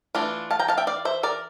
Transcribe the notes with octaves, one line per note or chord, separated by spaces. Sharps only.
E3 A3 D4 F4
F5 A5
G5 A#5
F5 A5
E5 G5
D5 F5
C5 E5
A#4 D5